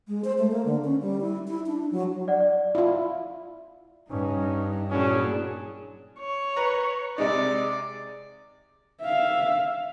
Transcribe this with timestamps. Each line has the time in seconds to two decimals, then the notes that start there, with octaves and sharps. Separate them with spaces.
0.08 G#3
0.24 C5
0.38 A3
0.51 A#3
0.65 D3
0.84 C#4
1.01 G3
1.21 E4
1.48 E4
1.67 D4
1.91 F#3
2.28 D5 F#5
2.41 D5
2.75 E4 F4
4.11 G2 C#4 D#4
4.91 A#2 F#3 C#4 D4 E4 G#4
6.20 C#5
6.56 B4 A#5
7.18 C3 G#3 D#4 D5
9.01 E5 F5